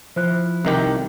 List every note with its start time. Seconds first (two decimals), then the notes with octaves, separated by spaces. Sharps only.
0.16 F3 E4 C5 F#6
0.65 C2 D#3 G4 E5